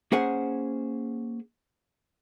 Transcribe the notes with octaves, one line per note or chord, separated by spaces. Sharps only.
A#3 C#4 G#4 C5 F#5 G#5